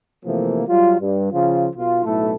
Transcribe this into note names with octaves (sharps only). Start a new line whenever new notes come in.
C3 E3 F3 A3 A#3
F#3 G3 F4
G2
C#3 F3 F4
B1 F4
B1 A2 A3 E4 A4